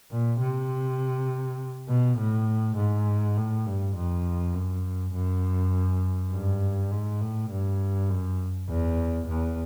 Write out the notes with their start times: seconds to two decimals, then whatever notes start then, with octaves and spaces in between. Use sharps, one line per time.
0.12 A#2
0.40 C3
1.89 B2
2.18 A2
2.77 G#2
3.37 A2
3.66 G2
3.96 F2
4.55 F#2
5.14 F#2
6.32 G2
6.92 G#2
7.21 A2
7.51 G2
8.10 F#2
8.69 E2
9.28 E2